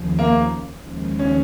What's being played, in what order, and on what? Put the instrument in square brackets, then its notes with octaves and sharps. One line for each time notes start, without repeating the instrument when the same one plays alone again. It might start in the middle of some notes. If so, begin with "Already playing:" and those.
Already playing: [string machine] D#2 C#3 F3
[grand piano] A#3
[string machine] D#2 C#3 F3 G#3
[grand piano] C#4